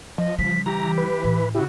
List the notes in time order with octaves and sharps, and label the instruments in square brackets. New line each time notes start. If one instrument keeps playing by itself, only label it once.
[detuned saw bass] F3 [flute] D#5
[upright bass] C#3 G3 [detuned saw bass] F3 [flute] B6
[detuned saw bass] E3 [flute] G4 [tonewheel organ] A#5
[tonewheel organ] B4
[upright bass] A2
[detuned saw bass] C#3 [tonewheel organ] E4 G4 [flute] F#4